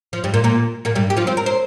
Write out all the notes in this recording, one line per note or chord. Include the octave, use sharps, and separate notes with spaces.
F3
G2 G3
A#2 A#3
A#2 A#3
A#2 A#3
G2 G3
G4
F3 F4
C4 C5
A#4
C5